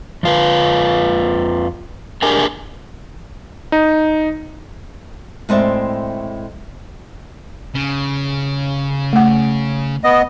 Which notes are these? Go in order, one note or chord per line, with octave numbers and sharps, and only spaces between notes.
F2 F4 B4
D4 G4 G#4 A#4 G#5
D#4
A2 G#3 C4 D5 E5
C#3
A3 F#5
B3 D#5